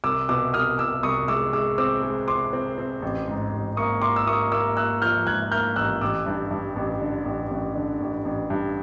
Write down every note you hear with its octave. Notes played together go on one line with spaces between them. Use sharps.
C2 D6 E6
B2 D6 E6
C2 D#6 F6
B2 D6 E6
C2 C#6 D#6
G#3 D6 E6
G#3 D6 E6
C4 D6 E6
G#3
C4 C6 D6
C4
C4
A1
G#2
A1
A#3 C#6 D#6
A#3 C6 D6
E6
A#3 C#6 D#6
A#3 D6 E6
A#3 E6 F#6
F3 F6 G6
G#2 F#6 G#6
A#3 F6 G6
A1 E6 F#6
A1 D6 E6
G2
G2
A1
D3
A1
A1
D3
A1
A1
G2